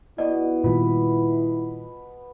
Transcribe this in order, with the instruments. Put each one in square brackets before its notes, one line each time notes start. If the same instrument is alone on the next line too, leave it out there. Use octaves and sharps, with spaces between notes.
[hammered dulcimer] B2 [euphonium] E4 [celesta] D5 D#5
[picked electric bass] A#2 D#3 G3 [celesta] F4 [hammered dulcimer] B4